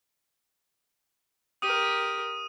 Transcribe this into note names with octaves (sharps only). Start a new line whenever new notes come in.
G4 A#4 D#6 D#7